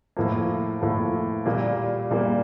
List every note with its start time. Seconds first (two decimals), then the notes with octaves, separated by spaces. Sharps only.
0.17 A2 F3 A#3
0.81 A2 F3 A#3
1.46 A#2 G3 A#3
2.11 A#2 G3 A#3